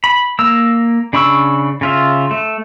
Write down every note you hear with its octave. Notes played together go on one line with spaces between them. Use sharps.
B5
A#3 A#5 E6
C#3 D4 B5 C#6 E6
C#3 F4 E5
A3